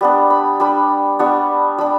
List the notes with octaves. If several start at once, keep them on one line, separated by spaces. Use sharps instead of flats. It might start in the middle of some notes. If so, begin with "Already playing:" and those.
G3 B3 D4
B5
G3 D4 B5
G3 B3 D4 C#6
G3 D4 B5